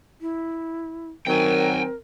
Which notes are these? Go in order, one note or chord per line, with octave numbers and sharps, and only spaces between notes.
E4
D#3 F#3 C4 A#4 G5 G#5